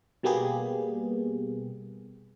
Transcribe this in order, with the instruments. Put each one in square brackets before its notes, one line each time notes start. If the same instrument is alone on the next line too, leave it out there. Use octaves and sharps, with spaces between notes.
[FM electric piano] B2 G3 A#3 B3 G4 G#4